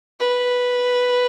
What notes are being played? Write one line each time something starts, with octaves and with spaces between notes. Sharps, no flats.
B4